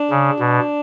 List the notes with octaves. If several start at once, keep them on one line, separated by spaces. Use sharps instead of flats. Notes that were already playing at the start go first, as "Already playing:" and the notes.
Already playing: D4
C#3
B2